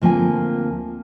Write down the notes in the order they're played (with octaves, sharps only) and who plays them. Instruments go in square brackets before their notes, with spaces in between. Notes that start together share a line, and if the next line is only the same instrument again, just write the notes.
[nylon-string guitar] D2 F3 A#3 C4 G#5